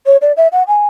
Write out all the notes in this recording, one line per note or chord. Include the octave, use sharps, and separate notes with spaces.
C#5
D5
E5
F#5
G#5